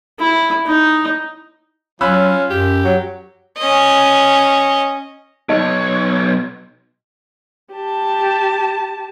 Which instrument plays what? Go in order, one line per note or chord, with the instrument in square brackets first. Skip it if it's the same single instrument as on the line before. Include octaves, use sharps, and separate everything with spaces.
[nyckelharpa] E4
D#4
[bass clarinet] F#3 [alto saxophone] C#4 [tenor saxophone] F4 [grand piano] B5 E6 F#6
[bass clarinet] F#2 [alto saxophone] G4
[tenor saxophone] F#3
[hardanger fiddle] C#4 D#5
[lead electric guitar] B1 C#5 [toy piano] D#4 D#5
[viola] G4 A5